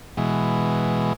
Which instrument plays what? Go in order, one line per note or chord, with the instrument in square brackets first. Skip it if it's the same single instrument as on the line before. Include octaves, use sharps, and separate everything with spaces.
[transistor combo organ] B2 E3 G#3